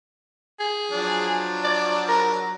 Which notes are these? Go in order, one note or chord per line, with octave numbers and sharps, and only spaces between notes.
G#4
F3 F#3 D4
D5
A#4